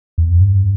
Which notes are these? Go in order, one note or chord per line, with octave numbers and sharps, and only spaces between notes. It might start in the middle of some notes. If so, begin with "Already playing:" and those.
E2
F2
G2